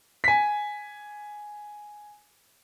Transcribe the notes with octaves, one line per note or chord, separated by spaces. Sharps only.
G#5 B6